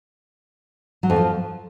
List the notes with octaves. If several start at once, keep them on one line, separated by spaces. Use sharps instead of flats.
F#3
F2
F3